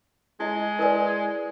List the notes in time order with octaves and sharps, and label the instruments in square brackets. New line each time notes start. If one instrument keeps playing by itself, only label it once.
[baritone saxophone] G#3 [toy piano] E4 D#5
[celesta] E4 B4 D5 [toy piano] A#4 G#5